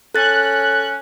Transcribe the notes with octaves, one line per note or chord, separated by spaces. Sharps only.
C#4 A4 F#6 A6